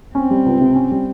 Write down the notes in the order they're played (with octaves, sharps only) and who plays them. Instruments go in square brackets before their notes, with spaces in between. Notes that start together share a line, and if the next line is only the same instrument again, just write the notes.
[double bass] C4 [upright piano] C#4
[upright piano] G3
C#2
C3
C#4
G3